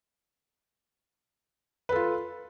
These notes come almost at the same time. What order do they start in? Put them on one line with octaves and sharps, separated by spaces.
B4 A4 F4